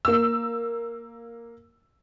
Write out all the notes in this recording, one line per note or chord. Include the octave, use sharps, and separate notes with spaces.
A#3 E6